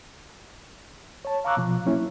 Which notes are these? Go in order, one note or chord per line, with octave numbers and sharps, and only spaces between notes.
C#5 A5
F5 A#5 C#6 D6 E6 F#6
B2 F3
F#3 A#3 C#4 E4